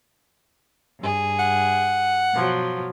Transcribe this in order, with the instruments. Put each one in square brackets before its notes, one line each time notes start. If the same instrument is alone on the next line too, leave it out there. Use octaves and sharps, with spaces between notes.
[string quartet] G2 G#4
[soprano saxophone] F#5
[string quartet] B2 F3 F#3